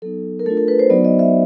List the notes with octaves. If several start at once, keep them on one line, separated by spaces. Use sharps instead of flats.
F#3 B3 D#4 A4
A#4
A3 D4 F4 A4
A#4
B4
C5
F#3 B3 D#4 F#4 D5
D#5
E5